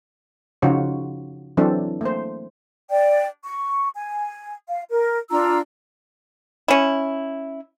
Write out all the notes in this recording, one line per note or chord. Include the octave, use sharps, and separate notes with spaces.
C#3 F3 D#4 F4 F#4 C#5
E3 F#3 C4 D4 A4
A3 A#3 C5
D5 G5
C#6
G#5
F5
A#4
D4 F4 A#5 E6
C#4 E4